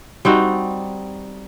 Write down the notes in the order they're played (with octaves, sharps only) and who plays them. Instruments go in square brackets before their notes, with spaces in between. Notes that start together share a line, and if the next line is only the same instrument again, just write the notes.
[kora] G3 C4 D#4 F#4